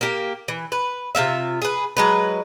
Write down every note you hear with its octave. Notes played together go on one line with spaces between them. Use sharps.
A#3 G4
E3
B4
C3 C4 F4 E5
G#4 B4
F#3 G#3 B4